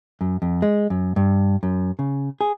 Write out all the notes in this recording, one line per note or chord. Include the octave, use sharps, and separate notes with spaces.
F#2
F2
G#3
F#2
G2
F#2
C#3
G#4